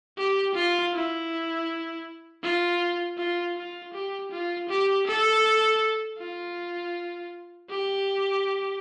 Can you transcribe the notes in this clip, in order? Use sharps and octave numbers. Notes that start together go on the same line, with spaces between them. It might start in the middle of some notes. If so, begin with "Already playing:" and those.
G4
F4
E4
F4
F4
F4
G4
F4
G4
A4
F4
G4